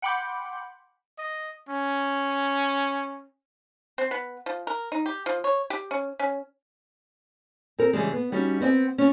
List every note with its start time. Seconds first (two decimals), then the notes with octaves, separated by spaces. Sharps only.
0.02 F#5 G5 B5 C6 D6 G6
1.18 D#5
1.69 C#4
3.98 C4
4.11 B3
4.46 F3
4.67 A#4
4.92 D#4
5.06 G4
5.26 F3
5.44 C#5
5.70 G4
5.91 C#4
6.19 C#4
7.79 C4 A#4
7.93 C#3 E3 G3 G#3
8.13 B3
8.32 G3 C#4 D#4 F#4
8.60 B3 C4 D#5 G5
8.98 C#4 F4